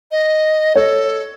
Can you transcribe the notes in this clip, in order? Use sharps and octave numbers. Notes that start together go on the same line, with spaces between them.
D#5
A4 C#5